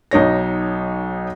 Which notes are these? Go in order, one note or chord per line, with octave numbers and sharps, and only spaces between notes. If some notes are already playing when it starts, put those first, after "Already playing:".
B1 D#4 C#5 A#6